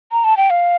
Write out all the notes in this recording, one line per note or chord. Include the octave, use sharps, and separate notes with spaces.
A#5
A5
G5
F5